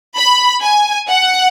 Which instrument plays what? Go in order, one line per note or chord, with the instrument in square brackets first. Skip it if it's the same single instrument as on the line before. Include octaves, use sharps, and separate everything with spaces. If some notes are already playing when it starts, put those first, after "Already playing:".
[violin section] B5
G#5
F#5